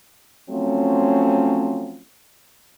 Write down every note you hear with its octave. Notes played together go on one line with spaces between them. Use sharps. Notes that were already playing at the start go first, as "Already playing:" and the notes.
F3 F#3 A3 C4 C#4